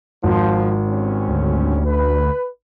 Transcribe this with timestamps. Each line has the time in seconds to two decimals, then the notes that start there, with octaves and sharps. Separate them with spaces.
0.23 G#1 F3
0.87 G3 C4 C#4
1.29 D2
1.85 B4